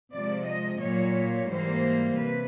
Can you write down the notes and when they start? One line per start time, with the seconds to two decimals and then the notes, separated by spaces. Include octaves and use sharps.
0.12 C3 F3 G#3 D5
0.46 D#5
0.80 A#2 F#3 A#3 C#5
1.48 G#2 E3 G3 A#3 C5
2.17 C3 B4